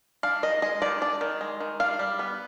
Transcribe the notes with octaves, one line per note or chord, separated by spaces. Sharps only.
D4 F5
D#3 D#5
G#3 D#5
D#3 D5
D4 D5
D#3
G#3
D#3
D4 F5
G3
B3